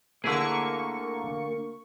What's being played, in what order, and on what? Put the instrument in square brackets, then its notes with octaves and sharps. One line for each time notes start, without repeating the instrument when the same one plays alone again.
[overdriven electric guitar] D2 [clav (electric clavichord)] D3 E4 G#4 [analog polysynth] A#3 C#6